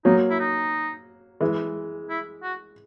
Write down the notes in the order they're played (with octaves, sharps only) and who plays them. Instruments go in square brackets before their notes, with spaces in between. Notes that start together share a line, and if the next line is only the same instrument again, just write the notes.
[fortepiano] F#3 A#3 [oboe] D#4
[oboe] E4
D#4
[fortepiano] E3 G#3
[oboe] E4
F#4